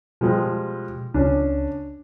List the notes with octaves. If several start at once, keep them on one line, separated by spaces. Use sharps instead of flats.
B2 F3 G3 G#3
C#2 C#4 D4